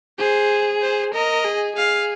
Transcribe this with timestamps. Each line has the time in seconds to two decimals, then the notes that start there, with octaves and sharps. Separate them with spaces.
0.19 G#4 C5
0.82 C5
1.14 A#4 D#5
1.45 G#4
1.76 G#4 F5